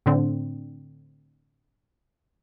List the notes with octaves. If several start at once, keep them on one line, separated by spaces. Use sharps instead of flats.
A2 D3 C4